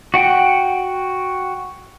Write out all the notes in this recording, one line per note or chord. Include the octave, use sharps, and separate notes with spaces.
F#4 F#5 G5